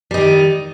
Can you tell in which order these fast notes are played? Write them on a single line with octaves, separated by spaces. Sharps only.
G3 D#4 D#3